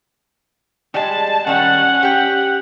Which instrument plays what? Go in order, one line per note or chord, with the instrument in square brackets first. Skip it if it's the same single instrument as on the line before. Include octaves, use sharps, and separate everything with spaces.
[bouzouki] G3 G#3 [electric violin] A5
[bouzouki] D#3 G3 [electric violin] C#4 F#5
[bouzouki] G4 G5